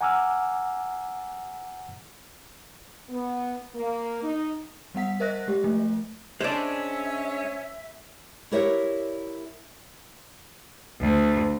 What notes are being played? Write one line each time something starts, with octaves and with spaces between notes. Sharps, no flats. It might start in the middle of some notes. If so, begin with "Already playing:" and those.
F#5 G#5 A#5 D6 E6 F6
B3
A#3
D#4
G3 B3 F#5 B6
A#4 C5 D#5 E5 F#6 A#6
G#3 G4
F3 A3
G#3 C#4 D4 C5 D5 E5
E4 G4 A#4 C#5 D5 E5
D2